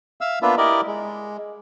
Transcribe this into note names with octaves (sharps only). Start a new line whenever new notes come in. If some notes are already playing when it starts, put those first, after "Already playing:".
E5 F5 E6
A#3 B3 D4 F4 B4 E5
E4 G4 A#4 D5 D#5
G#3